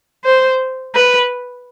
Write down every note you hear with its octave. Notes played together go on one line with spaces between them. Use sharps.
C5
B4